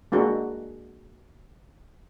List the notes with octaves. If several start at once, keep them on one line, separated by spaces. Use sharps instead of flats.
G#3 A#3 D4 F#4